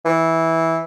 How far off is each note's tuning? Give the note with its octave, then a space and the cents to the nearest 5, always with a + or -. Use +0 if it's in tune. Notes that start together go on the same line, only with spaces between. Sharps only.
E3 -10